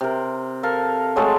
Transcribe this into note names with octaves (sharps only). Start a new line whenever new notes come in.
C3 A#4
A4 A#4 F5
F#3 G#3 A3 A4